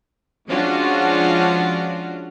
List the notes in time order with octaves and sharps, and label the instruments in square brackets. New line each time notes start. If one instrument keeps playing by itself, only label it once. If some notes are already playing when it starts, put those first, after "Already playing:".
[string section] F3 G#3 C#4 D4 F4 F#4